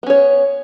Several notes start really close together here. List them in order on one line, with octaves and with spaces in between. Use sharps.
B3 C#4 C#5